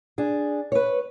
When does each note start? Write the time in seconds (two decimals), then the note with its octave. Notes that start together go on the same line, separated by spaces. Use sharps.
0.18 D4 G#4
0.72 B4 C#5